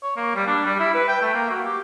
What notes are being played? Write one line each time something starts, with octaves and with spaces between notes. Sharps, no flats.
C#5
A#3
G3
D4
G3
E4
B4
G5
A3
A#3
F#4
G4